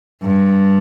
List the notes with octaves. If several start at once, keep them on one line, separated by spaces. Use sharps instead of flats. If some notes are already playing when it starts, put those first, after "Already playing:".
G2